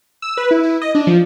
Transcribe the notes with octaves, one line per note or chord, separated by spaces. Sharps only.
E6
B4
E4
E4
D#5
D4
F3